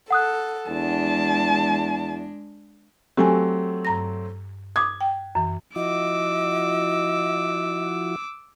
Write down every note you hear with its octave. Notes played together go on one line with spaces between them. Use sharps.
A4 F#5 D#6 F#6
E2 G#3 D4 A5
F#3 A3 C4 G4 A4 G#5
G2 A#5 A#6
D6 D#6 G#6
G5
F#2 E3
F3 E4 F#4 D#5 D6 E6